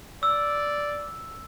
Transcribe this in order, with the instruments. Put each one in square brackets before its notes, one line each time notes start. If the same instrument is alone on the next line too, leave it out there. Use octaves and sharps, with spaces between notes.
[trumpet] D5 [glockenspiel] E6